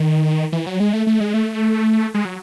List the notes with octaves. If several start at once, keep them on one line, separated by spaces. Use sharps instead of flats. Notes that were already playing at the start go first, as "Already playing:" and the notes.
Already playing: D#3
E3
F#3
G#3
A3
A3
G#3
A3
G#3
F#3